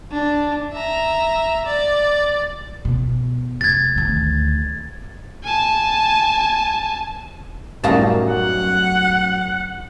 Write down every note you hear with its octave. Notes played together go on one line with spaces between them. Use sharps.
D4
E5 A#5
D5
B2
F1 G#6 A6
D2 D#3
G#5 A5
A1 F#2 G3 D#4 F5 A5
F#3 F#5